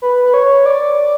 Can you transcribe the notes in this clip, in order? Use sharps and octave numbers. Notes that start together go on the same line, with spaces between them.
B4
B4
C#5
D5